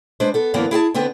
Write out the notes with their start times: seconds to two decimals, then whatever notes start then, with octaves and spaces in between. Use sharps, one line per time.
0.20 G#3 D4 B4 C5
0.34 B3 A4
0.54 F#2 D3 E3 A#3 B3
0.71 E4 G#4 G#5 A5
0.94 D3 B3 C4 B4